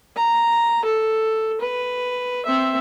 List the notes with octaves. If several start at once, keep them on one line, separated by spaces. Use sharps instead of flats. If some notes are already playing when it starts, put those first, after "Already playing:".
A#5
A4
B4
C4 E5